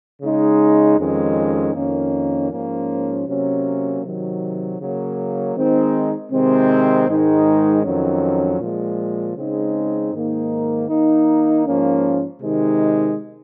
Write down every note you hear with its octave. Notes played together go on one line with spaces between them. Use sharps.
C#3 G#3 D#4
F2 D#3 G#3 C#4
F2 D#3 A#3 C#4
G#2 F3 A#3 C#4
C3 F#3 A#3 C#4
C3 D#3 F#3
C#3 F#3 A#3
D#3 G#3 C4 D#4
C3 D#3 G#3 C4
G#2 D#3 G#3 D#4
F2 D#3 F#3 C#4
A#2 F3 G#3
C#3 G#3 C4 D#4
G#2 D#3 A#3 D#4
D#3 A#3 D#4
G#2 F3 A#3 C#4
C3 D#3 G#3 D#4